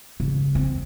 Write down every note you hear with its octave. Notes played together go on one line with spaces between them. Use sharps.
C#3
C4